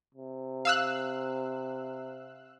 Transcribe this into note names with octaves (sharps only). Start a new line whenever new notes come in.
C3
F5 E6 F#6